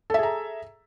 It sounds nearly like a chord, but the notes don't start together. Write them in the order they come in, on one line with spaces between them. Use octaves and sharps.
A4 E5 G#4 A#5